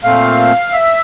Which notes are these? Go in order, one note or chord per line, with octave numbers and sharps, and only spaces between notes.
A#2 A3 C4 F5
E5